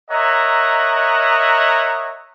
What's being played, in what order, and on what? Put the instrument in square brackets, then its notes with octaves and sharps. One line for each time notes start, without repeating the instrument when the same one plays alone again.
[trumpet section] A#4 C#5 D#5 E5 F#5 A#5